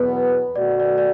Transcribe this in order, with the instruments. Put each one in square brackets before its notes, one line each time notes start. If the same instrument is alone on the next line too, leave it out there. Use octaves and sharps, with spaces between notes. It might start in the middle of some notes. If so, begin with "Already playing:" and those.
Already playing: [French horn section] E2 B2 F#3 B3 [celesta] B4
[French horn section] B2 A3 F#4 [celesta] D5
[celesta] D5
D5